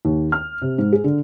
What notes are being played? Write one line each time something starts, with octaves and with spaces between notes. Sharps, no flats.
D#2
F6
C3
G#2
G#4
D3